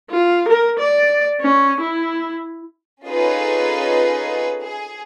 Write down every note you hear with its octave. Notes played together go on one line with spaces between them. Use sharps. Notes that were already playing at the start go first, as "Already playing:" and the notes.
F4
A#4
D5
C#4
E4
C#4 D#4 F4 G#4 A4 B4
G#4